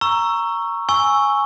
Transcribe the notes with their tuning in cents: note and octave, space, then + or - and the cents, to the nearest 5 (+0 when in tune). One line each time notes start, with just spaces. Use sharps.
A#5 +0 C#6 +0 E6 +15
G#5 +0 C#6 +0 E6 +0